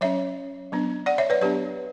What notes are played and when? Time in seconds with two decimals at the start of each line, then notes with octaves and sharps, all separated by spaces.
0.01 F#3 C#4 C#5 E5
0.72 F#3 B3 D4
1.06 D5 F#5
1.18 C#5 E5
1.30 B4 D5
1.41 F#3 B3 D4 G4 B4